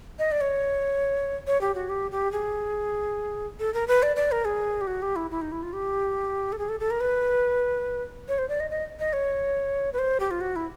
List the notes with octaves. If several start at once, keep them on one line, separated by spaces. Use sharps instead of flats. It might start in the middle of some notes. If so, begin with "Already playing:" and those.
D#5
D5
C#5
C#5
G4
F#4
G4
G4
G#4
A4
A#4
B4
D5
D5
A#4
G#4
G4
F#4
G4
E4
E4
D#4
E4
F4
G4
A4
G#4
A4
A4
A#4
B4
C#5
C5
D5
D#5
D#5
D#5
C#5
B4
C5
G4
F4
F#4
E4